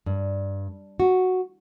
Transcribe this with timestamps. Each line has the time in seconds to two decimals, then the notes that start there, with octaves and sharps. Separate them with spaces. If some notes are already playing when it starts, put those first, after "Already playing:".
0.06 G2
1.00 F#4